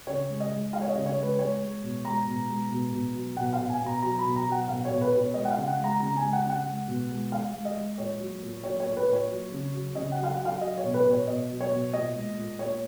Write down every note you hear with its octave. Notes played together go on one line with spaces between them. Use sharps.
C#3 C#5
G#3
D#5
G#3
G#3 F5
C#5
D#5
C#3
C#5
G#3
B4
G#3 C#5
G#3
B2
G#3 A#5
B2
G#3
B2
B2
F#3
B2 F#5
F5
B2
G#5
B2
A#5
F#3 A#5
B5
B2
A#5
F#3
F#5
B2 F5
C#5
B2
B4
B2 B4
C#5
G#3 D#5
F#5
F5
C#3
F#5
G#3
A#5
C#3 A#5
G#5
G#3
F#5
C#3
F#5
G#3
B2
G#3
G#3 F5
G#3
D#5
G#3
A#2 C#5
F#3
A#2
F#3 C#5
C#5
A#2
B4
A#2
C#5
F#3
C#3
F#3
C#3 D#5
F#5
F#3
F5
F#5
F#3
F5
F#3 D#5
C#5
B2
B4
B2 C#5
B2 D#5
F#3
C#5
B2
A#2 D#5
G#3
A#2
A#2 C#5